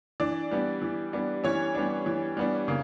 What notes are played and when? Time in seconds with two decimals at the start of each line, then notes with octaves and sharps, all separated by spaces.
0.20 E3 D4 D5
0.51 G3 B3 D4
0.82 E3
1.13 G3 B3 D4
1.44 E3 C#4 C#5
1.75 G3 B3 D4
2.06 E3
2.37 G3 B3 D4
2.68 C#3 A#3